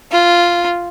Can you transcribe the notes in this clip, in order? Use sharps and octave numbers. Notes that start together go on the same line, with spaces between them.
F4